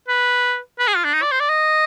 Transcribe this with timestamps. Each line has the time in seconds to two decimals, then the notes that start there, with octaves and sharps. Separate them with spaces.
0.09 B4
0.79 B4
0.87 G#4
0.96 F4
1.04 D4
1.14 D#4
1.23 D5
1.32 C5
1.40 D5
1.49 D#5